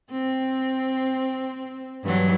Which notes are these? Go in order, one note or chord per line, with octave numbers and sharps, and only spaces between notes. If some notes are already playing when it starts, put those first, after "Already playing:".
C4
G2 E3 F#3